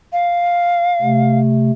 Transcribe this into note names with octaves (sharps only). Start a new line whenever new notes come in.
F5
C3 A3